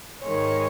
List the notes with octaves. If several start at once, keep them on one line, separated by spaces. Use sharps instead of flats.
G#2 D#3 G#3 C#5